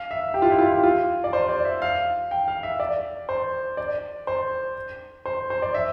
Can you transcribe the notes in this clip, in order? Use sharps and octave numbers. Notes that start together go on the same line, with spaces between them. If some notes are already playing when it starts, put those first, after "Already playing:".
Already playing: F5
E5
G4
F4
E4
F4
G4
F4
D5
C5
D5
E5
F5
G5
F5
E5
D5
C5
D5
C5
C5
C5
D5
E5